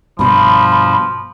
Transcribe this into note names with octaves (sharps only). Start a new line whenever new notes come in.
G2 B2 F3 B5